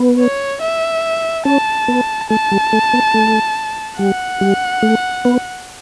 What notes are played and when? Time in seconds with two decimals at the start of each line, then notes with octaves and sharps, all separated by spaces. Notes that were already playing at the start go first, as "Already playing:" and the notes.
Already playing: B3
0.20 C#5
0.62 E5
1.45 C#4 A5
1.88 B3
2.30 A3 A5
2.51 G3
2.73 A3
2.93 B3
3.14 A3
3.98 G3 F#5
4.41 G3
4.82 A3
5.25 B3